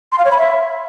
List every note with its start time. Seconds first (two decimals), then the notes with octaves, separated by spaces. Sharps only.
0.12 C6
0.18 F5
0.25 C#5
0.31 B5
0.37 E5